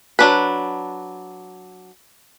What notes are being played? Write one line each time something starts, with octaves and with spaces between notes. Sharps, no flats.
F#3 D4 B4